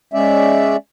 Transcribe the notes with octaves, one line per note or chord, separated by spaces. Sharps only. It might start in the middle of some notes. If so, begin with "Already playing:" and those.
G#3 C#4 D5 E5